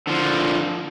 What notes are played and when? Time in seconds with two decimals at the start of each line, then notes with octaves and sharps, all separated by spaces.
0.07 D3 F3